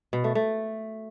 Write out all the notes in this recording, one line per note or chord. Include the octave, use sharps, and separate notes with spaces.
B2
A3
A3